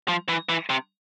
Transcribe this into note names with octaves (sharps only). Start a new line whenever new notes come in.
F3
E3
E3
C3